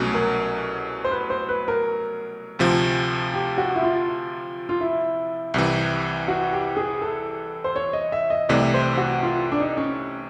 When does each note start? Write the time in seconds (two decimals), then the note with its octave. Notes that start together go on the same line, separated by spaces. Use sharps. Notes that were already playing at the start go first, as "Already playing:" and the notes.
Already playing: C2 B2 F#3 A3 C#4
0.14 A#4
1.04 C5
1.11 B4
1.30 C5
1.49 B4
1.68 A#4
2.59 D2 C3 F3
3.34 G4
3.58 F#4
3.75 E4
3.83 F4
4.69 F4
4.81 E4
5.54 C2 C3 E3
6.28 F#4
6.53 G4
6.77 G#4
7.02 A4
7.64 C5
7.76 C#5
7.93 D#5
8.12 E5
8.30 D#5
8.49 C2 C3 E3 A3 D5
8.74 C5
8.97 F#4
9.23 F4
9.52 D4
9.60 D#4
9.77 C#4